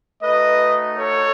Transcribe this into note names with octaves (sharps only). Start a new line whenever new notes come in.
A3 D#4 F#4 B4 D#5
A4 C#5